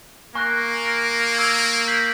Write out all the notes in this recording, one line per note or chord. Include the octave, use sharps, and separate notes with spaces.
A#3 G#5 C#6 F#6 A#6
F6 A#6 D7 F7
C#6 E6 G#6
G6 B6 D#7 F#7